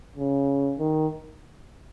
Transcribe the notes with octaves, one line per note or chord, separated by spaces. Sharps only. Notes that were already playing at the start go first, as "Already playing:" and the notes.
C#3
D#3